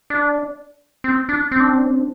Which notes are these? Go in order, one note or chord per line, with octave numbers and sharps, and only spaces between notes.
D4
C4
D4
C4
D4
C4
D4
C4
D4